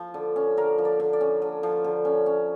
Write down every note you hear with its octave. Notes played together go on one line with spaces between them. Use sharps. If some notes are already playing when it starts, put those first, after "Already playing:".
Already playing: F3
D3
C#4
D3 A#4
F3
D5
D3
D5
C#4
D3
F3
D3
C#4
C#4